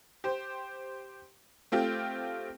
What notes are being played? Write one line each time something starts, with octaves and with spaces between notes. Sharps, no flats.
G4 C5
A3 C4 F4 G4